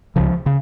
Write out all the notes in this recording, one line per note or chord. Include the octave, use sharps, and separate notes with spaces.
C#2 C#3 F3
C#3